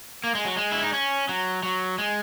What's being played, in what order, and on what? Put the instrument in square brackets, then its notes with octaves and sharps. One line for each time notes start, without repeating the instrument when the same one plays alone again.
[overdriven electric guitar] A#3
G#3
F#3
G#3
E4
D#4
C#4
F#3
F#3
G#3